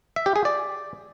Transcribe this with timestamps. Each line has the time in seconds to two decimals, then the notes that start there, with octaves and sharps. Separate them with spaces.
0.16 E5
0.26 G4
0.36 G#4
0.45 D5